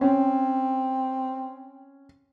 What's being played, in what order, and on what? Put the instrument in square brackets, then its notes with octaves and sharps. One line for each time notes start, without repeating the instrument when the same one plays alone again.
[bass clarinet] C4 [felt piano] C#4